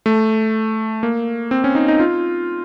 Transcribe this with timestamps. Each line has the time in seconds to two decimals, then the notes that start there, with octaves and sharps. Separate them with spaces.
0.06 A3
1.03 A#3
1.51 C4
1.64 C#4
1.75 D#4
1.88 D#4
2.00 F4